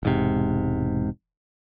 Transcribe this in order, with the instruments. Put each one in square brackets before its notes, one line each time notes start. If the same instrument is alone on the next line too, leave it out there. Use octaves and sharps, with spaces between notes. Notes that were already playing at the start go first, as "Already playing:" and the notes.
[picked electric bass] E1 G#2 C3